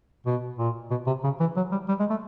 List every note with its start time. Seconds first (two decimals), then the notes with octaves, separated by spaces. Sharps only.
0.26 B2
0.59 A#2
0.91 B2
1.07 C3
1.24 C#3
1.40 E3
1.56 F#3
1.72 G3
1.89 G3
2.00 G#3
2.10 A3